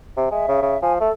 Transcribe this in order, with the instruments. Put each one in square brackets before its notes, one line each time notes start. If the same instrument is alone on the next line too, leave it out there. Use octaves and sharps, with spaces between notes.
[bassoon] C3
[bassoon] G#3 [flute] E5
[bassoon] C#3
C#3
[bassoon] F3 [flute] G#5
[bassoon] A3 [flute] A4